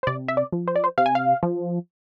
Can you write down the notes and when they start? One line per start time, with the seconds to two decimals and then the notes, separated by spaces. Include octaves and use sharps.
0.03 C5
0.07 C3 D5
0.28 E5
0.37 D5
0.52 F3
0.68 C5
0.76 D5
0.84 C5
0.98 C3 F5
1.06 G#5
1.15 F5
1.43 F3